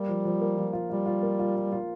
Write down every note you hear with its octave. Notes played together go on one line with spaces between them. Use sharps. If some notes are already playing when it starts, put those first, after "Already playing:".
Already playing: G3 A#3
F3
F3
A#3
F3
F4
G3 F4
F4
A#3
F4
F4
F4